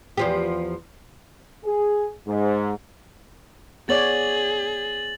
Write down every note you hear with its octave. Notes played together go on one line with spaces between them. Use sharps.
E2 F3 G4
G#4
G#2
B3 G#4 C#5 D5 A6 F#7